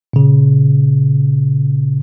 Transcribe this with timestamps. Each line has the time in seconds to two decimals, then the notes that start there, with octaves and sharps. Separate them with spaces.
0.13 A#2 C#3